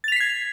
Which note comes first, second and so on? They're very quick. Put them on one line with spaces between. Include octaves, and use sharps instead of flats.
A6 F7 B6 C7 G#6